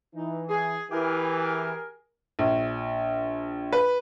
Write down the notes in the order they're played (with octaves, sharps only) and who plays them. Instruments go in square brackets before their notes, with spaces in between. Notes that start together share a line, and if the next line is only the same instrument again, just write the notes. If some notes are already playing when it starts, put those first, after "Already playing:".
[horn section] E3 [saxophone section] D#4
[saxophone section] G#4
[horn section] E3 [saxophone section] G4 G#4 A#4
[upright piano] A#1
B4